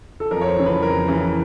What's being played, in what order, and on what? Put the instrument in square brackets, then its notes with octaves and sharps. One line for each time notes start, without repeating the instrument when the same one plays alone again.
[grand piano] A4
F2 A#4
C#5
C5
C#3 E3
B4
F2 A#4
C#3 E3